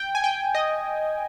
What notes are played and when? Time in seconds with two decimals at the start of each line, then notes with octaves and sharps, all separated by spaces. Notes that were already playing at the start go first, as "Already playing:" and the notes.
Already playing: G5
0.15 G#5
0.24 G5
0.55 D#5